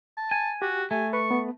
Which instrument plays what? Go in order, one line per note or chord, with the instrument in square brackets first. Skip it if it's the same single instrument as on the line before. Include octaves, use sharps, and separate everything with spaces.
[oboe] A5
[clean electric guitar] G#5
[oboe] F#4 [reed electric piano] G4
[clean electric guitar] A3 [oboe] G#5
[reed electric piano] B4 [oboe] C#6
[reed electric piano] B3